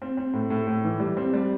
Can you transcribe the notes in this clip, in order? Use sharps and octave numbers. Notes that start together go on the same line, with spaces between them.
C4
C4
A2
A2
A2
E3
G3
C4
G3